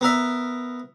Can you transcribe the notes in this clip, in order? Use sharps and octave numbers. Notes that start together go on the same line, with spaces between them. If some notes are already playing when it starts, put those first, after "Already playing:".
B3 A#4 E5